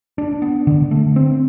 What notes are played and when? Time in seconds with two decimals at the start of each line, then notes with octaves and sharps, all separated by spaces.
0.18 D4
0.42 B3
0.67 D3
0.91 A3
1.16 C4